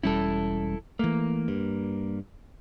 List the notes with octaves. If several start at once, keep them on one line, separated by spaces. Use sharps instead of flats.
E1 G3 C#4 E4 A4
E3 A3 A#3
G2